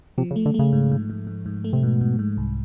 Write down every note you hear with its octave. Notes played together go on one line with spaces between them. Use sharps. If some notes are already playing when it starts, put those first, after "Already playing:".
C3 F3
C#3
A3
D3
C#3 A3
G#2
G#2
G#2
G#2
G#2
A3
C3
G#2 B2
G#2
G#2
C2